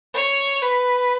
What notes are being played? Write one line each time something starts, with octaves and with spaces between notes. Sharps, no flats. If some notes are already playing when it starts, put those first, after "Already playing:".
C#5
B4